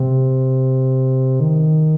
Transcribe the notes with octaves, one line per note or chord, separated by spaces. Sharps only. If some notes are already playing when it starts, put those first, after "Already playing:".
Already playing: C3
D#3